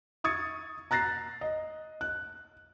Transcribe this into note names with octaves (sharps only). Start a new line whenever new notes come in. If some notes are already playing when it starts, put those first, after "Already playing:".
C#6 D#6 G#6 A6 C#7
A#5 F#6 A6 A#6 C7
D#5
F#6